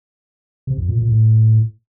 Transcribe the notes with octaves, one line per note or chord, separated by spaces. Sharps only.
C3
F2
A#2
A#2
A2